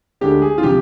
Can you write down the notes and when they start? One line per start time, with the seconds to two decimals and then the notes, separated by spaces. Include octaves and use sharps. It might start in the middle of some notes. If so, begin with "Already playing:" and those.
0.21 D2 D3 G#3 G4
0.42 G#4
0.58 F4
0.63 C3 F3 G4